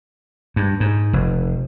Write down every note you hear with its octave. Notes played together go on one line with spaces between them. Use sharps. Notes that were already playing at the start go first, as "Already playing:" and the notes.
G2
G#2
F1